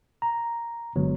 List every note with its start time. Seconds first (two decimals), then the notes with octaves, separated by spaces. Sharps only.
0.22 A#5
0.96 G1 D3 F#3 G#3 B3